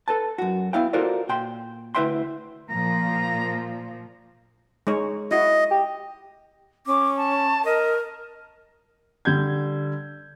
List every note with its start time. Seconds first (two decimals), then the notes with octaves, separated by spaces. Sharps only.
0.08 A4 B4 A5
0.38 F#2 F#4
0.73 B3 E4 F5 G5
0.93 F4 F#4 A4 A#4 C5 D5
1.29 A#2 G5 C6
1.95 D2 E4 B4 E5 G5 C6
2.70 A#2 F3 A#5
4.87 G#3 D#4 C#5
5.31 E4 F#4 D#5
5.71 G4
6.86 C#4 D6
7.16 A5
7.65 A#4 D#5
9.25 D3 G3 G6 G#6